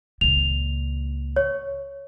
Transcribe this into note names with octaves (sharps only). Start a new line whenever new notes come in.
C#2 A#2 F7
C#5